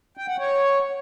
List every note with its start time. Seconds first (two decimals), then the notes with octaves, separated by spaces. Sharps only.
0.17 G5
0.28 F#5
0.38 C#5